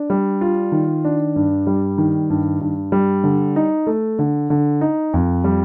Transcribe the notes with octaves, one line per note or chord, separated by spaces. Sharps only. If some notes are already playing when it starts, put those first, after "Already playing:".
Already playing: D4
G3
F4
D#3
D4
G2
G3
D#3
G2
G2
G3
D3
D#4
A3
D3
D3
D#4
F2
G3